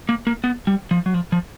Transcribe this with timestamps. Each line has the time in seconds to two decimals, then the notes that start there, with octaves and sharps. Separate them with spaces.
0.09 A#3
0.27 A#3
0.44 B3
0.67 G3
0.91 F3
1.06 F#3
1.14 F3
1.32 F3